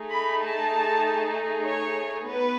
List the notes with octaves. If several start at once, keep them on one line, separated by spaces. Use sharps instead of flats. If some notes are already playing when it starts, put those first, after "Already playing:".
Already playing: A3 D#4 G#4
B5
A5
C#5
B3 B4